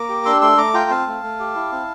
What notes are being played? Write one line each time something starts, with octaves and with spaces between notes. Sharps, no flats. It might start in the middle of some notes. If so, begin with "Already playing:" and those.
Already playing: A#3 A#5 D6
G4
D4 C6 E6
A3 C6 E6
A3 A#5 D6
F4 G5 A#5
C4 F5 A5
A3
A3
G4
E4
C4